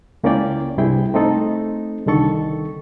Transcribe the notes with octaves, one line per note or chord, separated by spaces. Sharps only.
C#2 A#3 C#4 E4 D5 G5
C2 G2 C3 E4 G#4 G5
A3 C4 D#4 A4
C2 D3 D#3 A4 C#6